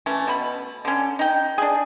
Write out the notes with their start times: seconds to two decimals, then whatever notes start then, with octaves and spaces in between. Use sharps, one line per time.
0.06 E3 A3 C#4
0.27 B2 B5
0.85 D3 C#4
1.19 D#4 G5
1.58 D4 G#4